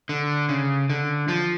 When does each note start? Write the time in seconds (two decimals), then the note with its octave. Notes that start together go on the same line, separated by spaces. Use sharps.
0.09 D3
0.49 C#3
0.90 D3
1.28 F3